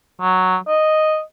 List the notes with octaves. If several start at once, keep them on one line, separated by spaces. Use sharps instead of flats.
F#3
D#5